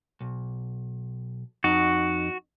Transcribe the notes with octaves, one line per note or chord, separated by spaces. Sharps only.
B1
F2 D#4 F#4